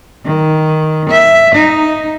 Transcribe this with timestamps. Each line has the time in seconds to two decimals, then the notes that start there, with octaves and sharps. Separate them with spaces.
0.25 D#3
1.10 E5
1.55 D#4